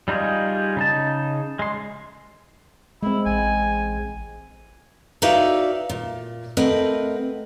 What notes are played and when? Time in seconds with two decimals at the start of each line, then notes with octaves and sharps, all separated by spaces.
0.08 G3 D#4 F4 G4 G#4
0.77 C#3 D#4 A5
1.59 G#3 C6
3.03 G#3 C4 E4
3.26 A1 G#5
5.22 D#4 F#4 B4 D5 E5 F5
5.89 A#2
6.57 A3 C4 A#4 B4 D#5 F#5